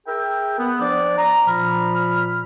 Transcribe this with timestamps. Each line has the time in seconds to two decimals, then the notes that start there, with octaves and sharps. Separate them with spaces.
0.07 G#4 A#4 E5 G5
0.59 B3
0.81 F3 D4 D5
1.18 A#5
1.47 A#2 F3 B5 F6